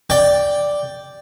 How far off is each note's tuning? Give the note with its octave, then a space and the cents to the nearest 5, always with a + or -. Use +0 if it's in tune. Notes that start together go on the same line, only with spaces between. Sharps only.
D5 +0 G5 +0